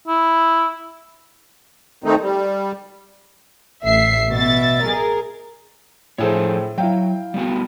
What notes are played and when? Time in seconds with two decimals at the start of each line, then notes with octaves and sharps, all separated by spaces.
0.08 E4
2.04 D#3 A3 C4 D#4
2.21 G3
3.84 A1 E5 C7
4.33 B2 E5 A6
4.84 G#4 A#4
6.18 A2 F3 G#4 A4 C5 C#5
6.78 F#3 E4 F5 G5
7.34 G3 B3 F#4